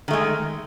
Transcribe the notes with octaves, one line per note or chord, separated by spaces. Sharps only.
D#3 G#3 A3